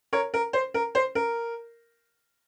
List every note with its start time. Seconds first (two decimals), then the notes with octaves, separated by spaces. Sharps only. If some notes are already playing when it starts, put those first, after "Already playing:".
0.13 A#4 C#5
0.34 A#4
0.53 C5
0.74 A#4
0.95 C5
1.15 A#4